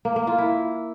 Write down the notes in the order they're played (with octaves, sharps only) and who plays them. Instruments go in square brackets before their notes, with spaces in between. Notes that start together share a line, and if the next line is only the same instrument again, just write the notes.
[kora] A#3
A#3
F4
E4